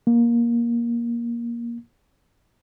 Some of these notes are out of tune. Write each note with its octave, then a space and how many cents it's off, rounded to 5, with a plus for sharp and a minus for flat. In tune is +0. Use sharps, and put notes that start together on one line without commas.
A#3 +15